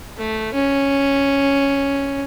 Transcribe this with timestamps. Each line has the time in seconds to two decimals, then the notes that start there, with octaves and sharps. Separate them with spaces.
0.17 A3
0.54 C#4